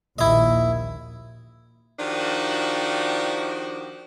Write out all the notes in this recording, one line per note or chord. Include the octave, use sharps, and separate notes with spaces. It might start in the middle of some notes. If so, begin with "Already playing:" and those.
A#1 D#2 E4 D#5
D#3 F3 D4 F#4 G4